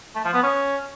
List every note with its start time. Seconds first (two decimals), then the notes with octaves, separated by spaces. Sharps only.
0.15 A3
0.25 F3
0.34 B3
0.43 C#4